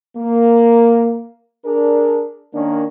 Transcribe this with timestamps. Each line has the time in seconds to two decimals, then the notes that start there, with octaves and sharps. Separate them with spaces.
0.17 A#3
1.65 D4 G#4 A#4
2.54 D#3 A#3 C#4 D4